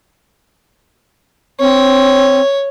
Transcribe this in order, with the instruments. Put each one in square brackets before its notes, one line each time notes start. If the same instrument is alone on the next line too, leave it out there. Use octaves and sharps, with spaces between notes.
[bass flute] C4 [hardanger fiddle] C#5